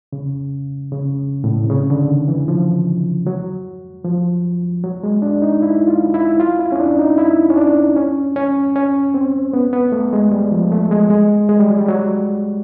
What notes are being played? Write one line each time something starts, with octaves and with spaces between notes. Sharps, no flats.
C#3
C#3
A2
C3
C#3
D3
D#3
E3
F3
F#3
F3
F#3
G#3
D4
D#4
E4
F4
E4
F4
E4
C#4
D4
D#4
E4
C#4
D4
C#4
C#4
C#4
C4
B3
B3
A3
G#3
G3
F3
A3
G#3
G#3
G#3
G3
F#3
G3
F#3